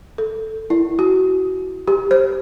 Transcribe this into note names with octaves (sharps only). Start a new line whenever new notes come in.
A4
E4
F#4
G4
C5